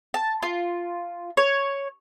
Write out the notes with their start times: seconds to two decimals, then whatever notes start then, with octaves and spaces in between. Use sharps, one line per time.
0.14 A5
0.43 F4
1.37 C#5